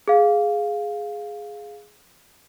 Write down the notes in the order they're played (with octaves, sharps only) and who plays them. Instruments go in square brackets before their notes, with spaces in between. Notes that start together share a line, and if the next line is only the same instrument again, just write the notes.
[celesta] G#4 F5